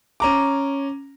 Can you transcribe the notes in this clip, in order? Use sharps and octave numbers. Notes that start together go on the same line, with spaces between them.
C#4 A#5 D6